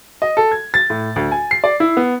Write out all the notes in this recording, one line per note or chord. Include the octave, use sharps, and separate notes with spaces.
D#5
A4
G#6
A6
A2
D2
G#5
C7
D5
E4
B3